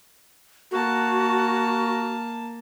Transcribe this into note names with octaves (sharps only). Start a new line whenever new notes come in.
A#3 F#4 A5